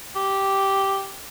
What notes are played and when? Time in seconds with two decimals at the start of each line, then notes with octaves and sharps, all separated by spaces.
0.16 G4